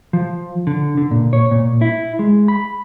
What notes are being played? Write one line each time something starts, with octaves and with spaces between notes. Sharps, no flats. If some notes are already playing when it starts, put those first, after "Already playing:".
F3
D3
D3
A#2
C#5
A#2
E4
G#3
B5